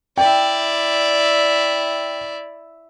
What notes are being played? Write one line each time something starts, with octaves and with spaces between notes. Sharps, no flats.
E4 D5 G5